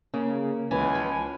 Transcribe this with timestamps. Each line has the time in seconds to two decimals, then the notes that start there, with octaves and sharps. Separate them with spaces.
0.14 C#3 A#3
0.71 C#2 E3 C#4 B4 G#5
0.95 F3